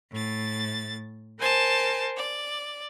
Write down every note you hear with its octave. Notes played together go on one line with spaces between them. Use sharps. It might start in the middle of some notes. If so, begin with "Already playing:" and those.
A2 A6
A#4 C5 G#5 A5
D5